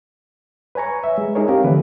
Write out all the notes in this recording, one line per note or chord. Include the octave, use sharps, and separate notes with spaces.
B4 C#5 G#5 A#5 C#6
E5
G#3
D4 D#4 G#4 A#4 C#5
C4 G4 A#4 F5
D3 E3 F3 A3 B4